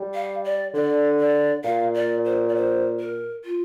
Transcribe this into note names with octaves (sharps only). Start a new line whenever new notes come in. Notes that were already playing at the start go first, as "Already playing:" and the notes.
Already playing: G3
F5
D5
D3 D5
D5
A#2 F5
D5
C5
D5
C5
A#4
F4